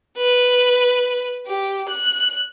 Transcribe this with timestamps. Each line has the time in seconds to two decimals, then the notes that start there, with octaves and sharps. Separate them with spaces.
0.17 B4
1.47 G4
1.89 F#6